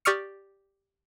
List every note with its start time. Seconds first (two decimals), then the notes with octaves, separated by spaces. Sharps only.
0.05 G4 D5 C#6 D#6 F6 C#7